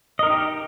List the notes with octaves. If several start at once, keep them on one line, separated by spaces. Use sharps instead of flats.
D#4 G4 A#4 D#5